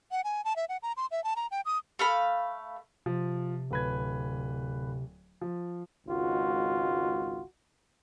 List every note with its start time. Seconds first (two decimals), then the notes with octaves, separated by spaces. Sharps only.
0.11 F#5
0.24 G#5
0.45 A5
0.56 E5
0.69 F#5
0.83 A#5
0.97 C6
1.11 E5
1.24 A5
1.36 A#5
1.51 G5
1.65 D#6
1.99 A3 F5 B5
3.06 C3 F3
3.71 D1 B4 G#6
5.41 F3
6.07 G#1 C#2 F4 F#4